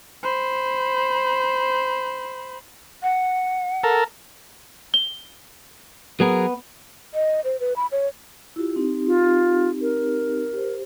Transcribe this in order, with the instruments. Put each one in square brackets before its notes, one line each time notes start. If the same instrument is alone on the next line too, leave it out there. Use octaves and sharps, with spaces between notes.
[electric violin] C5 B5
[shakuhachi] F#5
[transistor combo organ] A4 A#4
[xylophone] G7
[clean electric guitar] F#3 G#4 A#4 [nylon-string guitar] B3
[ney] D#5
C5
B4
B5
C#5
[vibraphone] E4 F4 G4
C4 D#4 G4
[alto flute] F4
A#4
[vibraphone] G4 C5